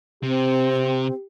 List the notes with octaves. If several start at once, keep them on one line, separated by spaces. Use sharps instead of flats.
C3 C4 G4